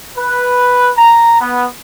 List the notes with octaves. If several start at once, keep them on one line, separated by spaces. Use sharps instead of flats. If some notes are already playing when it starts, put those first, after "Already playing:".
B4
A#5
B3